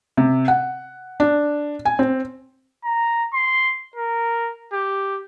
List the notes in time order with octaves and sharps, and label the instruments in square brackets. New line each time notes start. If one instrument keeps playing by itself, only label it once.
[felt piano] C3
F#5
D4
G#5
C4
[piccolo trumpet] A#5
C6
A#4
G4